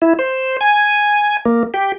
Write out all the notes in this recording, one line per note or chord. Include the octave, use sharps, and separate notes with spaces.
E4
C5
G#5
A#3
G4